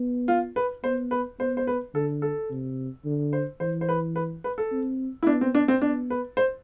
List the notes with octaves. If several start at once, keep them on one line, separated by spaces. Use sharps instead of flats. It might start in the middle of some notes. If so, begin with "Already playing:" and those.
Already playing: B3
F4
B4
B3 C5
B4
B3 C5
C5
B4
D3 A4
A4
C3
D3
C5
E3 C5
C5
B4
B4
B4
A4
C4
E4
B3 D4
C4
D4
C4
B3 D4
B4
C5